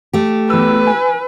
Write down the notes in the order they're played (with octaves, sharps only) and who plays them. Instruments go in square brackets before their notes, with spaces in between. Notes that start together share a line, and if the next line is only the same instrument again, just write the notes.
[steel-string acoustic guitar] A3 G4
[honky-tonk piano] E2 E6 [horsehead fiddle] B4
[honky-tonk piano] G#5